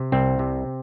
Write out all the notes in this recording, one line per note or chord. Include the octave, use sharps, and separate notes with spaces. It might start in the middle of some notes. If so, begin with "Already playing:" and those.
Already playing: C3
C2 C4
C3